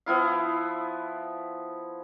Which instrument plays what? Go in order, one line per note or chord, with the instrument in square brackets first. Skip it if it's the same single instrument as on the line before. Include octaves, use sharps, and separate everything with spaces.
[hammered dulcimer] F3 B3 E4 F5